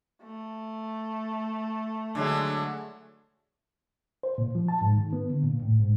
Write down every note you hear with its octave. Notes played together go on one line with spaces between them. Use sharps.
A3
D3 F#3 G#3
C5
A#2
F3
A5
G#2
D#3
B3
D3
A#2
A2
G#2